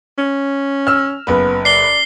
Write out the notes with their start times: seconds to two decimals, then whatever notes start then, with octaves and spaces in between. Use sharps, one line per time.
0.18 C#4
0.87 E6 F6
1.27 F#1 B3 B4
1.65 D5 C7 G7